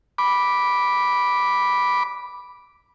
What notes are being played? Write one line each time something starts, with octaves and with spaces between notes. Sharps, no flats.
B5 D6